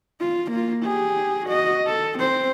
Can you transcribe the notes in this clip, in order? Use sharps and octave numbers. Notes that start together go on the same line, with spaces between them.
F4
A#3 F4
G4 G#4
F#4 D#5
A4
C4 C5